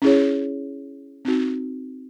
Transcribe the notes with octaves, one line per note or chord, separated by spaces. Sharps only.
C#4 E4 G#4 C#5
C4 D#4 F#4